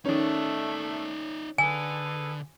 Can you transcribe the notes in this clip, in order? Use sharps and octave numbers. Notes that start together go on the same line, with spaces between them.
D#3 A3 C#4 D#4 D5
D3 G#4 A4 B4 G#5